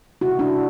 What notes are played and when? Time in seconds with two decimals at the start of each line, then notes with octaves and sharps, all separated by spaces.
0.21 C3 E4 F#4
0.39 D4 E4